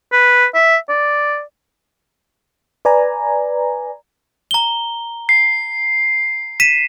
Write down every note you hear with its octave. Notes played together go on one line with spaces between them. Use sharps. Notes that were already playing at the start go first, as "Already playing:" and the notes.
B4
E5
D5
B4 D5 G#5 A#5
A#5 G7
C7
B6 D#7 E7